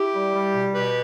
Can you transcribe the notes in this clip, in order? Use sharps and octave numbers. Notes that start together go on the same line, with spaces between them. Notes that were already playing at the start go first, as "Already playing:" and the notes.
Already playing: E4 G4
G3
G3
B2
B2 G4 B4